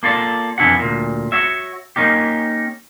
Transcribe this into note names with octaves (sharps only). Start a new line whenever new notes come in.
A#3 F4 A4 D5
F2 E3 D4 E4 F#4 F#5
D2 A#2
F#4 C#5 E5
A#3 C#4 D#4 G4